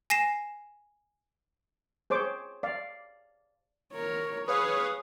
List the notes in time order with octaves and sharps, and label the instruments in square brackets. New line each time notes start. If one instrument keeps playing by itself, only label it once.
[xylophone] G#5 A#6 C7 E7
[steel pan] G#4 C5 C#5 D6
D5 F5
[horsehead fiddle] A#4 C#5
[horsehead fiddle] G#4 [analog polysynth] B4 C#5 F5 [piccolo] D#6